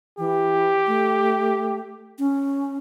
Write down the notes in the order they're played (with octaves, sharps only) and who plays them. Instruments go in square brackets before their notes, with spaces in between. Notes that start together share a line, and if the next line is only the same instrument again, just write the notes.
[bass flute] E3 [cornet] G4
[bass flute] A3
C#4